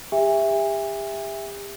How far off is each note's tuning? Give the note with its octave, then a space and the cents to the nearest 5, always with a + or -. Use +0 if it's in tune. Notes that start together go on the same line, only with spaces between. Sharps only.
G4 +35 E5 +0 G#5 -35